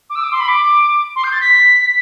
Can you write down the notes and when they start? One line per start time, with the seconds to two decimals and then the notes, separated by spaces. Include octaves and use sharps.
0.10 D6
0.15 E6
0.24 D6
0.32 C6
0.40 B5
0.48 D6
1.16 C6
1.24 G6
1.33 A6
1.41 B6